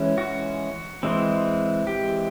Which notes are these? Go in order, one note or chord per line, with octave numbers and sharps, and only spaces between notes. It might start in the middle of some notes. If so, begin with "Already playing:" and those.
Already playing: E3 G#3 C#4
F#4
E3 G#3 C4
G4